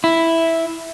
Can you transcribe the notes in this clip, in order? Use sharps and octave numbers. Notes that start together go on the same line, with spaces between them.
E4